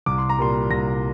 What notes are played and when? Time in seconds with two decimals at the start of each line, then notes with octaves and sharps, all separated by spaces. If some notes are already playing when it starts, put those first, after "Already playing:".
0.06 C2 D6
0.18 C6
0.29 A#5
0.38 A#2 G3 A#3 C6
0.71 C2 A#6